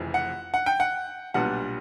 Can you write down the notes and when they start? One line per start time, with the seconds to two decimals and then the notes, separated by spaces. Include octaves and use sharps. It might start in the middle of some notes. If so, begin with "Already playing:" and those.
Already playing: F1 F2 C#3 E3
0.14 F#5
0.54 F#5
0.66 G5
0.80 F#5
1.34 B1 A#2 G3 B3 D4 F#5